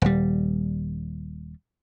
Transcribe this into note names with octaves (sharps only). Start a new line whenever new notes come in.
D#1 G3